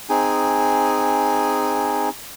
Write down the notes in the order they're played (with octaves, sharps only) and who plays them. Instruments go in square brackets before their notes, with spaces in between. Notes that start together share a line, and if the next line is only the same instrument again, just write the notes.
[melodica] C4 D#4 G#4 G#5